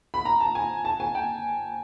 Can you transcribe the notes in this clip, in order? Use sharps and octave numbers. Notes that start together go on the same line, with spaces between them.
B5
A#5
A5
G#5
A5
G#5
G5